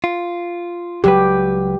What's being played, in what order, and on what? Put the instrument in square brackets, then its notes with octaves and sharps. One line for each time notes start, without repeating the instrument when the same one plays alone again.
[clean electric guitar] F4
[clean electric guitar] C#2 F#3 B4 [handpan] G4